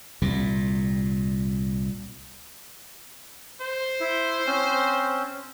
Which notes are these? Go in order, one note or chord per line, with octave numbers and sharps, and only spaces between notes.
C2 A#2
C5
E4
C4 C#4